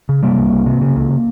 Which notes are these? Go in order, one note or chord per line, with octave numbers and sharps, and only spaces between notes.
C#3
C3 G3 A#3
C2
C2
C3
C#3
C#2